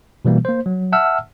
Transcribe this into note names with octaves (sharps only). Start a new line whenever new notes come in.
B2 E3 G3 A#3
A#3 C5
F#3
E5 F#5 A5 E6 F6